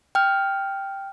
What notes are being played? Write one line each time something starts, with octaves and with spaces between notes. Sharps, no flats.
G5 F6